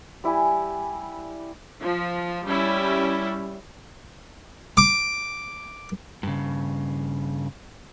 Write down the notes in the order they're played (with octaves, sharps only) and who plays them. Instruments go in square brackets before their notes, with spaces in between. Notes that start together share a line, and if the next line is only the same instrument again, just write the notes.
[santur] G3 E4 G4 G#5
[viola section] F3
G3 C#4 E4
[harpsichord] D6
[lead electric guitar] G2 C#3